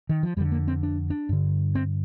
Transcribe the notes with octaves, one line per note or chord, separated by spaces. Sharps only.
D#3
F3
F2 D3 G3
A#3
C4
D4
D4
G2 D3
C4